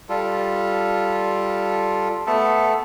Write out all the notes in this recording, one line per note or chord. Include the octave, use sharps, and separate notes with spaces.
G3 F4 A4
A3 B3 A4